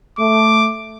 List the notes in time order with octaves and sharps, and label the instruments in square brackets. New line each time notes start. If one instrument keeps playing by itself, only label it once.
[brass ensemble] A3 [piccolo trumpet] D6